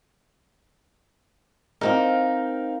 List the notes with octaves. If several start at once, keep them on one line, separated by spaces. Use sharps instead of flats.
C4 D#4 A#4 F5